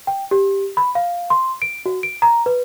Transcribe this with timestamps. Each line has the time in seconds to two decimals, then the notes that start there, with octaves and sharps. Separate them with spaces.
0.07 G5
0.31 G4
0.77 B5
0.95 F5
1.30 C6
1.62 D7
1.86 F#4
2.03 D7
2.22 A#5
2.46 B4